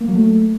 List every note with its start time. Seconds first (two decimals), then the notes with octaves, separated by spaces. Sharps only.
0.01 A#3
0.08 F#3
0.16 A3